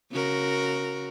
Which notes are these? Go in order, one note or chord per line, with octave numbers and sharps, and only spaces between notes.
C#3 F#4 A#4